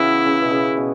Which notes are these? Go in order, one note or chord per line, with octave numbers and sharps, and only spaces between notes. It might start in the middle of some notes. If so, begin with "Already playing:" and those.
Already playing: C#3 E3 B3 C#4 E4 F#4
C#3
B2
C#3
B2